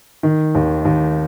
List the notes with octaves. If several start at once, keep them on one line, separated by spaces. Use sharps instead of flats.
D#3
D#2
D#2